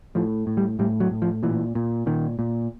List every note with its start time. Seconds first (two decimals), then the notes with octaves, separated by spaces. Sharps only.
0.15 A2 F3
0.47 A2
0.57 G3
0.79 A2 G3
1.00 F#3
1.11 A2
1.22 F3
1.43 A#2 E3
1.75 A#2
2.06 A#2 D#3
2.39 A#2